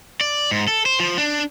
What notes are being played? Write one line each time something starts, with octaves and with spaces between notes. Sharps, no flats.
D5
G#2
A4
C5
F3
D4